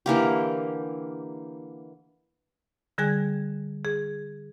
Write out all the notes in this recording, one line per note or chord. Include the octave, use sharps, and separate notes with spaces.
D3 E3 A#3 G4
D3 G3 G#4 G#5 F#6 G#6
G#4